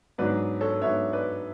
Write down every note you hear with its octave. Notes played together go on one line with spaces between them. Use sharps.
G#2 F#3 B3 D4 B4 D5
A4 C#5
G#2 F#3 B3 D4 C#5 E5
B4 D5